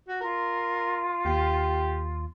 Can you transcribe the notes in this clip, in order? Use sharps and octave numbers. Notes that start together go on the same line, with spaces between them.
F#4
F4 A#4
D#2 G4